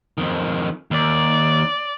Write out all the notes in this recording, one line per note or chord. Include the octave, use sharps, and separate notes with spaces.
F2 D#3
D#2 D5